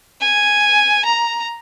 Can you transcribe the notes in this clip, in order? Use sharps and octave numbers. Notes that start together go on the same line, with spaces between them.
G#5
A#5